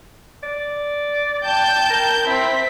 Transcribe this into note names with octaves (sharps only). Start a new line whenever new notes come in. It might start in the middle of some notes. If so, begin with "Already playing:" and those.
D5
G5 A5 G6
A#4
C4 E4 B6